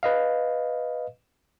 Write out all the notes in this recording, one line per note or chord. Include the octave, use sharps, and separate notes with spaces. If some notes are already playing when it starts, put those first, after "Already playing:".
B4 D#5 F5